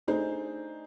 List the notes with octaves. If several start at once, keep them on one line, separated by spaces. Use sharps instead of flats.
A3 D4 D#4 G#4 C5